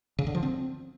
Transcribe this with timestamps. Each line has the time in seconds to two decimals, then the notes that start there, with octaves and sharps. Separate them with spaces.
0.19 C#3
0.27 D3
0.35 F3
0.43 C4